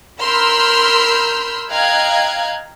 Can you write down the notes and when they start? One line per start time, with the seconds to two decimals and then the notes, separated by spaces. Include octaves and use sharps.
0.21 A#4 B5 C6 E6 F6 G6
1.70 D#5 F5 G5 A#5 F#6 G#6